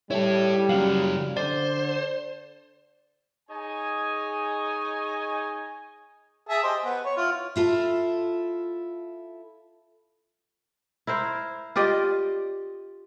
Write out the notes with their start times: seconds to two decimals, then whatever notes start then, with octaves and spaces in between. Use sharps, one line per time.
0.11 G3 E4 A4 C#5
0.69 C#3 F#3 F5
1.37 D3 C5 D5
3.50 D#4 G#4 C#5 D#5 G#5
6.49 G#4 E5 A5
6.63 G4 C5 D#5
6.85 B3
7.05 C#5
7.17 E4 F4
7.56 E4 F4 A4
11.07 E4 A#4 C5
11.76 F4 G4 D5 D#5